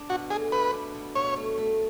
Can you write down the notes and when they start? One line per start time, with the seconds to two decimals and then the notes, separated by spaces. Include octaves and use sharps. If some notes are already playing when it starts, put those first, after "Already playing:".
Already playing: D4
0.09 B2 F#4
0.30 A3 G#4
0.52 B2 B4
0.73 D4
0.95 B2
1.15 B2 C#5
1.36 A3
1.58 A3